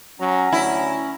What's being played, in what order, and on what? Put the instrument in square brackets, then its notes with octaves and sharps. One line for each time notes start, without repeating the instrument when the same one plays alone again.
[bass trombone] F#3 [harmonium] C#4 A#5 [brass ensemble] F#5
[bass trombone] D2 [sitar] E4